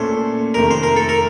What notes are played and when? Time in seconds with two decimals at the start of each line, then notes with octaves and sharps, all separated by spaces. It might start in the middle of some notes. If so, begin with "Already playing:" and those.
Already playing: A#2 A3 C#4 A4 C5
0.54 F2 C3 D#3 A3 A#4
0.71 C5
0.83 A#4
0.96 A4
1.09 A#4